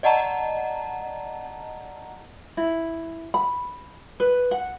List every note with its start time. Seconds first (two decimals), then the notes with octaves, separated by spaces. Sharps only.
0.03 D5 D#5 F#5 A5 A#5
2.57 E4
3.34 B5
4.20 B4
4.51 F#5